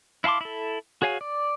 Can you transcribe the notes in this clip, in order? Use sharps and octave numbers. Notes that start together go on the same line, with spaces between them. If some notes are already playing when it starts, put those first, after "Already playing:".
E4 F5 A5 C6 D6
E4 A4
F#4 G#4 C#5 F5 G#5
D5